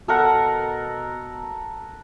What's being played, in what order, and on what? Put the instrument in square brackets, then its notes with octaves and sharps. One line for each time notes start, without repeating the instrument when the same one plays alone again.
[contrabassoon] B2 [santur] A4 A#4 F#5